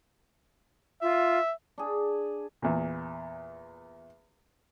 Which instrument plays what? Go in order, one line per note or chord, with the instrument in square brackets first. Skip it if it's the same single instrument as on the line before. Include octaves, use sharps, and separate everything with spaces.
[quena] F4 [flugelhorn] E5
[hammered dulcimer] D4 G#4
[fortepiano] E2 A#2